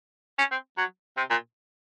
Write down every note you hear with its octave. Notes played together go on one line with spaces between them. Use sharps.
C#4
C4
F#3
C3
A#2